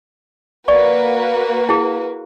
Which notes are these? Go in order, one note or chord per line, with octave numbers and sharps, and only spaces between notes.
A#3 F#4 B4 D5 C#6
E4 G#4